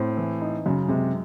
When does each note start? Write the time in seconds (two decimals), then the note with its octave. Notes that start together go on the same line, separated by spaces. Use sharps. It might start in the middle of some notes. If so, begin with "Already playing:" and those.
Already playing: A2 C4
0.17 E3
0.41 D#4
0.66 F#2 C#3
0.88 C3 G#3